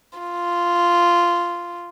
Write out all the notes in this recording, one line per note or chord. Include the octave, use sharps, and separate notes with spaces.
F4